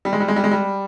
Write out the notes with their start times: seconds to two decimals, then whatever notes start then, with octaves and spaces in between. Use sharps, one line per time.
0.05 G3
0.13 G#3
0.20 G3
0.28 G#3
0.36 G3
0.44 G#3
0.51 G3